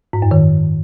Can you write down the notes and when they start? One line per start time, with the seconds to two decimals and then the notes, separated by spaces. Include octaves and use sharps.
0.13 G#2
0.22 F#2
0.31 D#3